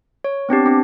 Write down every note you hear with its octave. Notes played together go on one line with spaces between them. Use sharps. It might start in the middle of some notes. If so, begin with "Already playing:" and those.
C#5
B3 C4 D4 G4
C4 D4